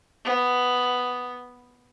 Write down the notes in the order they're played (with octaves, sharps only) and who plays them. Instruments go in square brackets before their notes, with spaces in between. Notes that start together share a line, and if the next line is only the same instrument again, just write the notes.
[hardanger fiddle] B3